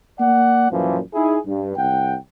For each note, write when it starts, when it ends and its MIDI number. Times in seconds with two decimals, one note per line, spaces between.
0.20 0.71 58
0.20 0.71 74
0.20 0.71 78
0.71 0.99 42
0.71 0.99 46
0.71 0.99 52
0.71 0.99 53
1.14 1.37 63
1.14 1.37 64
1.14 1.37 68
1.46 1.73 43
1.77 2.16 36
1.77 2.16 78
1.77 2.16 79